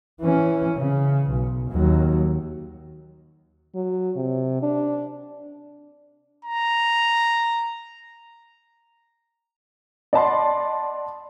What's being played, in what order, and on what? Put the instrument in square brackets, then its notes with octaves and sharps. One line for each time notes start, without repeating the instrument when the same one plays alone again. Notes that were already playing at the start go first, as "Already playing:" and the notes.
[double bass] E3 C#4
C#3
B1
D#2 F#3
[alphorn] F#3
C3
D4
[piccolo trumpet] A#5
[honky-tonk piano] D5 D#5 F#5 A5 B5 C6